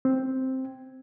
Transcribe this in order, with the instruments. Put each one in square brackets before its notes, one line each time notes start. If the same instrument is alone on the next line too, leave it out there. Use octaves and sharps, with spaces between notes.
[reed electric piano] C4